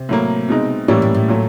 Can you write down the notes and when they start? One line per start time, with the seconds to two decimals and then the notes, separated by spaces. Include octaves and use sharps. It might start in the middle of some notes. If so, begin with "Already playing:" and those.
Already playing: C3
0.09 A2 F#3 A#3
0.49 B2 G#3 C4 D#4
0.88 A2 E3 G3 A#3 C#4 E4
1.02 A2
1.14 A2
1.28 A#2 F#3 A3